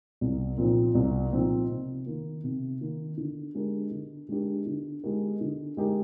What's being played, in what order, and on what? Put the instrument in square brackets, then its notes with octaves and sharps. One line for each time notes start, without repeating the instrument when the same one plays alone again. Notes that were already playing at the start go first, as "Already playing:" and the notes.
[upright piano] C2
A#2 F3 C4 D#4
C2
A#2 F3 C4 D#4
C3
D#3 A#3
C3
D#3 A#3
D3
G#3 D4 G4 A#4
D3
G#3 D4 G4 A#4
D3
G#3 D#4 G4 A#4
D3
G#3 D#4 G4 A#4